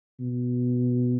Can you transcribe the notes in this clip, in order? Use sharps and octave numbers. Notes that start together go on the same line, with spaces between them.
B2